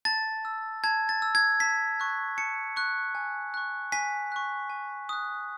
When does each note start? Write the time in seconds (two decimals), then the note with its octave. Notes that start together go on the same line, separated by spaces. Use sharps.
0.05 A5 A6
0.45 E6
0.84 A5 G#6
1.09 A6
1.22 E6
1.35 G#6
1.60 A5 B6
2.00 C#6 F#6
2.38 A5 C#7
2.76 C#6 F#6
3.15 G#5
3.54 C#6 F#6
3.92 G#5 B6
4.32 C#6 F#6
4.70 G#5
5.09 D#6 F#6